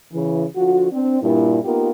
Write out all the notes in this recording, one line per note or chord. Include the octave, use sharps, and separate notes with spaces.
C#3 E3
D3 F3 F4 F#4
C4 D4
G2 A#2 E4
A#3 B3 D#4 F4 G4 A#4